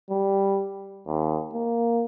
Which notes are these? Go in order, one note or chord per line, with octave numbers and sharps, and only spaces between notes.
G3
D#2
A#3